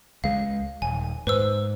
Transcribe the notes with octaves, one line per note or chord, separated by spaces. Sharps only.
C#2 G#3 F5
D#1 G#5
G#2 B4 C5 E6